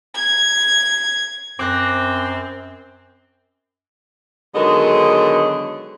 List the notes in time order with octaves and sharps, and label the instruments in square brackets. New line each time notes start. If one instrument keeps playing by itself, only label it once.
[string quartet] G#6
[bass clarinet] F#2 [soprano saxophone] C4 [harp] D6 F#6 A#6
[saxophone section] D3 D#3 F#3 G#3 B3